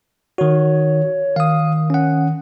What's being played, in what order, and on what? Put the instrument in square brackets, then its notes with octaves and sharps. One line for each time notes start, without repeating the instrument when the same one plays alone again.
[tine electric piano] D#3 F#4 [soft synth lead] C#5
[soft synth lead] D#3 [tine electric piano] F5 D#6
[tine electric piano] C#4 F#5